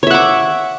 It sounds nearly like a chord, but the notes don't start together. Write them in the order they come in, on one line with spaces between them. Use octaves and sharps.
C#5 E5 F#5 D6